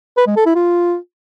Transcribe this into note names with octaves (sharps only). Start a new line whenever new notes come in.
B4
G#3
A4
E4
F4